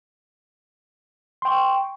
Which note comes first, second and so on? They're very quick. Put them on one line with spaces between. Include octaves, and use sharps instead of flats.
C6 G5 C#6